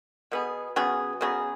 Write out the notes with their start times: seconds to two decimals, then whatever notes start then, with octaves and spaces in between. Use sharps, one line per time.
0.32 B2 B3 G#4
0.76 C#3 F#3 B3 G#4
1.21 C#3 F#3 B3 G#4